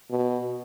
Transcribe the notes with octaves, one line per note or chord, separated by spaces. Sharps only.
B2